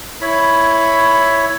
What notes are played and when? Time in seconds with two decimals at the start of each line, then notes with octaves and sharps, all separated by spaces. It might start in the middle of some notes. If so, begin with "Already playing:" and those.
0.21 E4 C#5 B5